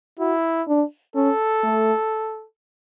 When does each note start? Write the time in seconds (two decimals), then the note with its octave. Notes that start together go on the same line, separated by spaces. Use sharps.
0.19 E4 F#4
0.68 D4
1.16 C#4 A4
1.63 A3